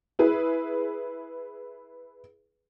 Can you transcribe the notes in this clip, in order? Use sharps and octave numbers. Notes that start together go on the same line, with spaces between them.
E4 G#4 B4